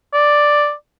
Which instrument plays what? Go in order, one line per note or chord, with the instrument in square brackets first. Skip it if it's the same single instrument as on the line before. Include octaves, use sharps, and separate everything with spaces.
[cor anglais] D5